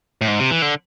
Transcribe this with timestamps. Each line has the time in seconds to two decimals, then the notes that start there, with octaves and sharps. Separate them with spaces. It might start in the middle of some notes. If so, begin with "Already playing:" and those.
0.21 A2
0.27 G#2
0.39 C3
0.51 E3
0.62 D3